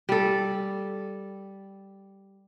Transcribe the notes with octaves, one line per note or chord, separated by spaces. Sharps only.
G3 A4